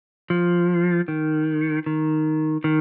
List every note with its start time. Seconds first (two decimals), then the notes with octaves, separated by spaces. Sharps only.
0.30 F3
1.08 D#3
1.86 D#3
2.64 D#3